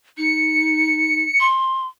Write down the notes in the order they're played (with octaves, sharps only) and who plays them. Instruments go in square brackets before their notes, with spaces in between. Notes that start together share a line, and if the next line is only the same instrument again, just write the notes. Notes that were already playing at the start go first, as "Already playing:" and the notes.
[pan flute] D#4 [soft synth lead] C#7
[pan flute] C6